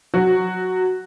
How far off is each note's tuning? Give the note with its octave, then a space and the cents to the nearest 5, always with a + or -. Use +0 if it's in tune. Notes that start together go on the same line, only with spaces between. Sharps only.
F#3 -15 F#4 +0